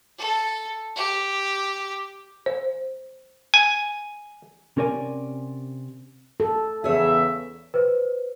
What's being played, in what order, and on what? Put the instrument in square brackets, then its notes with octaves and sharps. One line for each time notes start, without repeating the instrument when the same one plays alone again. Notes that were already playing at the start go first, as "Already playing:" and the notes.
[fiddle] A4
G4
[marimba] C5
[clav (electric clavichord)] G#5
[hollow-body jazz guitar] C3 C#4 A#4 D5 G#5
[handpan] A4
[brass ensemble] E2 C#3 E5 [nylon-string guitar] G#4 C#5
[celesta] B4 C5